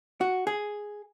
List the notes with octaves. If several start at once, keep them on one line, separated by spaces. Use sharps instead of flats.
F#4
G#4